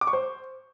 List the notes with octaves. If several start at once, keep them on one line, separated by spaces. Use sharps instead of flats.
D6
C#6
C5